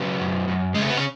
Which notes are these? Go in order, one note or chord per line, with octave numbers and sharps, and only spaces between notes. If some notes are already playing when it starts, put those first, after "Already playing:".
Already playing: C#3 F#3 B3
F#2
F#2
C#3 G#3
A3
B3
C#4